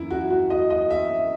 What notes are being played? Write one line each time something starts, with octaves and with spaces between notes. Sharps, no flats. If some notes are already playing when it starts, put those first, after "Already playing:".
Already playing: F#2 E3 E4
F#4
F#4
D#5
D#5
E5